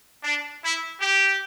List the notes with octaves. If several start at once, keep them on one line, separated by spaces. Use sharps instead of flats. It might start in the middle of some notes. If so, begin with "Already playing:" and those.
D4
E4
G4